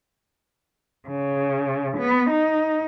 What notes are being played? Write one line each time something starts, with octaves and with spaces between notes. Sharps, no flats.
C#3
B3
D#4